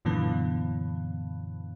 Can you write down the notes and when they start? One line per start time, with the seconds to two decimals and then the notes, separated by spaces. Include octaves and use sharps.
0.05 F#2 A#2 D3 E3 B3